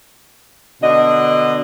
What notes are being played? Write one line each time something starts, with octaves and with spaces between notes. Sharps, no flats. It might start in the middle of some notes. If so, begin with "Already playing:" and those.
B2 D3 D4 D#5